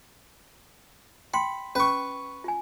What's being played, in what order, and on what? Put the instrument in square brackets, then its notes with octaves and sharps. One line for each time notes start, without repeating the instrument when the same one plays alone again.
[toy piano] G5 C6 [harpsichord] B5
[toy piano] C#4 [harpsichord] B4 C#6
[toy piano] F4 G#5